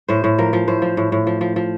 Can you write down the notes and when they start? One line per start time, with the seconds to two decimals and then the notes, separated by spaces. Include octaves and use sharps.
0.09 A2 C5
0.24 A2
0.38 F3 A#4
0.53 F3
0.68 A2 C5
0.82 F3
0.97 A2
1.12 A2
1.27 F3
1.41 F3
1.56 F3